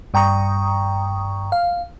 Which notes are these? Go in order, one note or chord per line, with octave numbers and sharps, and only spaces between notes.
G2 G5 A#5 C#6 D#6
F5